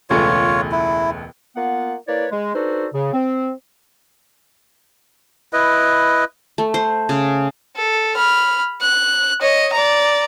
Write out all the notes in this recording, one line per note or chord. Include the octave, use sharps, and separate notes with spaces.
E1 C#2 A3 F4 C#5
E4
A#3 B3 F4 F#5
A#3 E4 B4 C#5 D5
G#3
D4 D#4 F#4 A4 B4 C5
C#3
C4
E4 B4 D#5
A3
C5
C#3
A4
B5 F6
F#6
C#5 D#5
D5 A#5